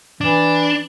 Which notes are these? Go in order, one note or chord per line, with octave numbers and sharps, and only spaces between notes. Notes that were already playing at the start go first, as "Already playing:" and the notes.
E3 D4